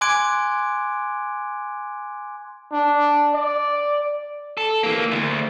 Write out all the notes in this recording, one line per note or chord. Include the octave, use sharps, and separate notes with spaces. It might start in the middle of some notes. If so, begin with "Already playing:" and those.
G#5 C6 D6 F#6 G#6 D7
D4
D5
A4
E3 A#3
D2